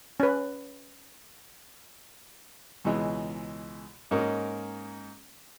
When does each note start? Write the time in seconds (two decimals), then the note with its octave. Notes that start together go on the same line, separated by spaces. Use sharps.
0.20 C#4 B4
2.85 C#2 B2 E3 G#3
4.11 G#2 A#3 C#4 A#4 D#5